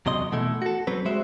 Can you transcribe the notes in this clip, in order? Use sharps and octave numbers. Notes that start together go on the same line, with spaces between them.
E2 C3 F#3 D#5 C6
B2 E3 A3 E4
F#4 A4
F#3 C4 B4
G3 G#3 F#4 C5 E5